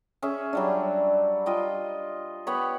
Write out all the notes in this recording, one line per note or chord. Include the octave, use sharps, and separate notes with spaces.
C#4 G#4 E5
F#3 G3 D4
F4 D#5 G5
B3 G4 C#5 B5